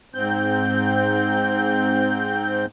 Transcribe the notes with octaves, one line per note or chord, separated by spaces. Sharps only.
G#2 C4 G6